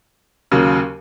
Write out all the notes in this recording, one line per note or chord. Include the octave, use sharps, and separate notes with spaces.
D#2 C#3 F#3 A#3